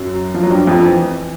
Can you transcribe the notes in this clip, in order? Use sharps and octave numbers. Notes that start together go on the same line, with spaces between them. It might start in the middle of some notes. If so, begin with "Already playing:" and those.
Already playing: F#2 F#3
F3
F#3
G2 G3
F2 F3
E3